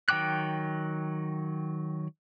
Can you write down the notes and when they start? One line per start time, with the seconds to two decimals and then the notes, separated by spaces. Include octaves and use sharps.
0.09 D#3 F#3 G5 D6 F#6